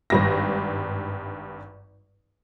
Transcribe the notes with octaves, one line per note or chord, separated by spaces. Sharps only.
G#1 G2 A#6